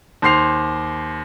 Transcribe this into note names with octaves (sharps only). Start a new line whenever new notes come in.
D#2 C5 C6 C7 F7